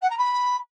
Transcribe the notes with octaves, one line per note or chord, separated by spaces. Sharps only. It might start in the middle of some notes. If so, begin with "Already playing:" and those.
F#5
A#5
B5